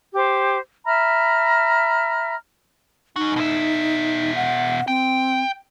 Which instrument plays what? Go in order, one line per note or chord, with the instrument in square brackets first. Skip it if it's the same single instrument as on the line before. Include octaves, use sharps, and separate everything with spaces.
[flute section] G4 C5
E5 A#5 B5 F6
[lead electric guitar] F#2 F#4 [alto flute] D#4
[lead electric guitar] B2 E5
[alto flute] F#5
[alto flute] C4 [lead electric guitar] G5